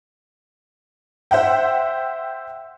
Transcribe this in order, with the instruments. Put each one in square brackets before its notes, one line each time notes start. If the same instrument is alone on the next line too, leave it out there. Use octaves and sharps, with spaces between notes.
[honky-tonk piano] C5 E5 F#5 G5